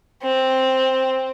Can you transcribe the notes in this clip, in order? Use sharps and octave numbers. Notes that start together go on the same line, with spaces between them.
C4